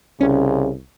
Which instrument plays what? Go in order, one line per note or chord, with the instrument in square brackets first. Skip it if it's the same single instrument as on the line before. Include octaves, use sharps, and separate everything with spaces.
[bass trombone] C2 [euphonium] C#3 [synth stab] C#4